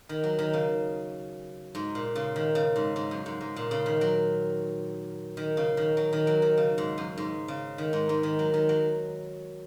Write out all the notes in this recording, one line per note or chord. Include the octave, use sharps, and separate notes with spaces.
D#3
F#3
D#3
C#3
G#2
A#2
C#3
D#3
C#3
G#2
G#2
F#2
G#2
G#2
A#2
C#3
D#3
F#3
D#3
C#3
D#3
F#3
D#3
F#3
D#3
C#3
G#2
F#2
G#2
C#3
D#3
G#2
G#2
D#3
F#3
D#3
F#3